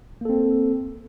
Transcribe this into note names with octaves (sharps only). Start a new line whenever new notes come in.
A#3 C4 A4